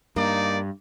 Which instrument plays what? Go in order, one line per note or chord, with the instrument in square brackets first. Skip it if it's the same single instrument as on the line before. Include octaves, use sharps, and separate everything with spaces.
[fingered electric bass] G2 [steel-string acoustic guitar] A#3 [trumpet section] D#4 D5